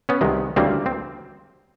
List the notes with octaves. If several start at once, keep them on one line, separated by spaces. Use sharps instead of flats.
B3 C#4
C2 C3 D#3 G#3
D2 C#3 E3 G3 A#3 C4
C4